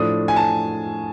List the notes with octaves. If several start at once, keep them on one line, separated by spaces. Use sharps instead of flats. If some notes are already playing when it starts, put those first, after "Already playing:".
Already playing: A2 F3 A3 D4 D#6
G#5
A5